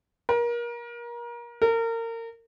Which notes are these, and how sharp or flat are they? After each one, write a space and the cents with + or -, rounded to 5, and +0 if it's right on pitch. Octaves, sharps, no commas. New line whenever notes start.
A#4 +30
A#4 -30